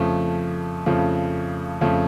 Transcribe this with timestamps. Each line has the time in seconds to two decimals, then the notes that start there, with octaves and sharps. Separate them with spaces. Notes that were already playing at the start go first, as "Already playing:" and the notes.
Already playing: F2 C#3 F3 A3
0.86 F2 C#3 F3 A3
1.81 F2 C#3 F3 A3